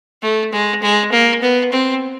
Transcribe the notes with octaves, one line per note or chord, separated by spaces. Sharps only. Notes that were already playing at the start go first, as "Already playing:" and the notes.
A3
G#3
G#3
A#3
B3
C4